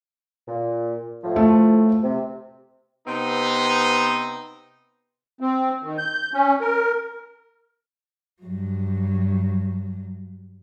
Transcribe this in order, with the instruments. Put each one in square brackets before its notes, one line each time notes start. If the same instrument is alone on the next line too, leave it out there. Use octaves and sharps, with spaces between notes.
[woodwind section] A#2
A2 F3
[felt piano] A3
[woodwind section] C3
[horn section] C3 B3 C4 D#4
[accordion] C4
D#3
G6
C#4
A#4
[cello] G2 F#3